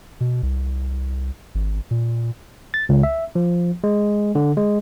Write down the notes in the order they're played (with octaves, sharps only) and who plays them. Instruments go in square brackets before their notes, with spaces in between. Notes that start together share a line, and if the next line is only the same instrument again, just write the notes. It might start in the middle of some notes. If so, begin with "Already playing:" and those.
[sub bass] B2
C2
G#1
A#2
[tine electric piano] A6
C#2
E5
F3
G#3
D3
G#3